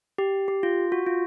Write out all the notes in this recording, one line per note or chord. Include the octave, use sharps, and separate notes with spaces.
G4
G4
F4
F#4
F4